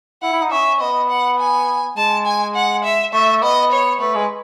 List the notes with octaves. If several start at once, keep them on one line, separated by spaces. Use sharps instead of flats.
E4 F#5
E4
D#4
C#4 E5
B3 D#5
F#5
G#5
G#3 A5
G#5
F#5
E5
A3 E5
B3 D#5
C#5
A3 B4
G#3